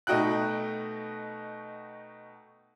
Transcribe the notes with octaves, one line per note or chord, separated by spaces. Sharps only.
B2 A3 D#4 F#4 G5 F#6